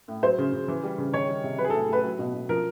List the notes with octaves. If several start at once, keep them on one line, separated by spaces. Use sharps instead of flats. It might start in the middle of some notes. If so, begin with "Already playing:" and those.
A2
F#3 C5
C#3
C#3
E3
G3
C#3
D#3 C#5
G3
C3
F#3 B4
G#4
A4
A2
A2 B4
F#3
B2
B2
F3 A#4